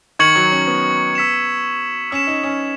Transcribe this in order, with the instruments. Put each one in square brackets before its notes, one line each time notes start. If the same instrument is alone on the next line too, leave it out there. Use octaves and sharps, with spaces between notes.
[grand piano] D#3 [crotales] C#6 G#6 C#7 F#7
[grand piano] F#3
C#4
B3
[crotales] E6 B6 E7
[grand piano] C#4 [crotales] E6 B6 E7
[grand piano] D#4
C#4